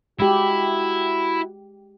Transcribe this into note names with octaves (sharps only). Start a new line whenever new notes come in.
G#3 E4 F#4 G4